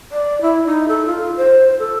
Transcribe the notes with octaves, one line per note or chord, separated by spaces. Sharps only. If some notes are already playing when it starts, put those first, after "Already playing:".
D5
E4
D#4
A4
F4
C5
A4